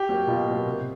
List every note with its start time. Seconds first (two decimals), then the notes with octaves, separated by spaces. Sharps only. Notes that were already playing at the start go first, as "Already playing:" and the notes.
Already playing: G4
0.09 F#3 A#3
0.27 B2 F4
0.47 F#3 A#3
0.65 C3